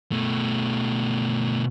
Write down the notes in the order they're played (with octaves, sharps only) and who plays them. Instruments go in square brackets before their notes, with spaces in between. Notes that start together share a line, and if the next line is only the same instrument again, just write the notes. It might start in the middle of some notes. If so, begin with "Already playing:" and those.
[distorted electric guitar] B2 A3